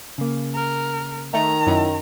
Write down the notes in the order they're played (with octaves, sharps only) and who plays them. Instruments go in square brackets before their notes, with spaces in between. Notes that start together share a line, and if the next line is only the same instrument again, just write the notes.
[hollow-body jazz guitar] C#3 A#3
[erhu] A#4
[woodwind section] D#3 [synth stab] A3 [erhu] A#5
[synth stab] F#2 [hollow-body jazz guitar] E4 D#5